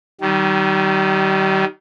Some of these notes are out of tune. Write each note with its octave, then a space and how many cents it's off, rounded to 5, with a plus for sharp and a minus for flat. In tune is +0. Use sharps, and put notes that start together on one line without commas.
D#3 +0 G3 -35